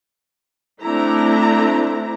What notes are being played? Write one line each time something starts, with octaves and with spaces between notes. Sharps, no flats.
A3 C4 D4 E4 A#5